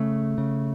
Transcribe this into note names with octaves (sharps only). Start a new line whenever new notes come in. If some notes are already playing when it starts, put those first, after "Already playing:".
Already playing: C#3 A3
C#3